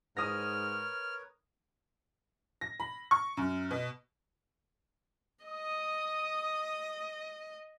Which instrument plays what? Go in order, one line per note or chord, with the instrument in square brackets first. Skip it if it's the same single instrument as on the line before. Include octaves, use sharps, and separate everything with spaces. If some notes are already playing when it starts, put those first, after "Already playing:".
[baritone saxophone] G#2 [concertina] A#4 B4 C#5 [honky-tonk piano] D#6 A#6 [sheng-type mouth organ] F6
[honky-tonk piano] A#6
B5
C#6
F#2
B2
[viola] D#5 [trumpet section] D#6